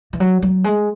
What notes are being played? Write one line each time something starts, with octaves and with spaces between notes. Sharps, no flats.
E3
F#3
F#3
G#3